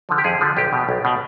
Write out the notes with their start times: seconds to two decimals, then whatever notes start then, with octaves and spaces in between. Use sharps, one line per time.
0.09 D3 F3
0.18 G4
0.24 F2 G#4
0.41 D3 F3
0.57 B1 G4
0.73 B2
0.89 B1
1.05 B2